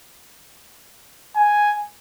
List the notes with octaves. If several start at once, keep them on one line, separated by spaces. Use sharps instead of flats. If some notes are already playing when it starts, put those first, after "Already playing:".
G#5